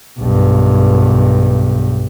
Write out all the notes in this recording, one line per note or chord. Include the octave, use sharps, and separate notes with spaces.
B1 G2